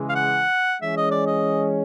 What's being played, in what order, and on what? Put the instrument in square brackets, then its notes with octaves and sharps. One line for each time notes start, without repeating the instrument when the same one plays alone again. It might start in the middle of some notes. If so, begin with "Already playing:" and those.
Already playing: [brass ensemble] C#3 E3 G#3
[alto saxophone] F5
F#5
[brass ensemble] E3 G#3 C#4 [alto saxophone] E5
[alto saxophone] D#5
D5
D#5